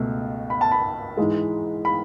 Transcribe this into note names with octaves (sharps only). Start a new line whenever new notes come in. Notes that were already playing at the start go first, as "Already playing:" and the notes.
Already playing: C#2 B2 A3
B5
A5
B5
G#2 E3 G#3
B5